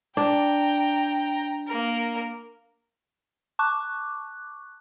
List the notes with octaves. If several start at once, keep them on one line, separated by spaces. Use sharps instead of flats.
D4 G5 A#5
A#3 A#4
A5 C#6 D6 F#6